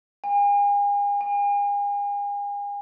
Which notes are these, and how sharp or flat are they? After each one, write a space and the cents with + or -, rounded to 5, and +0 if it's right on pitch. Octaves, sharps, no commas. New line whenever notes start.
G#5 -40
G#5 -40